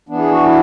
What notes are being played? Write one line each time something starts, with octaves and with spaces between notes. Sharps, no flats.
E3 B3 D4
G#4
F#4
E4